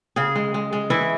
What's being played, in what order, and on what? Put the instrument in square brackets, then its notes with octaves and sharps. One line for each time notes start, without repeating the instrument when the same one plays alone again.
[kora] C#3 G#4
G#3
G#3
G#3
E3 E4